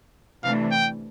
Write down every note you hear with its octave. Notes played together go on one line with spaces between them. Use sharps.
C3 E3 A3 D4 F5
G5